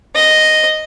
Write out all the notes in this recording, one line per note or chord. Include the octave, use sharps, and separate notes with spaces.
D#5